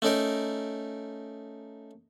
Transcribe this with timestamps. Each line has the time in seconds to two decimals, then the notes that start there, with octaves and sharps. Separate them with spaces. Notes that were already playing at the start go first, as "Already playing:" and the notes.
0.02 A3 C#4 D#4 A#4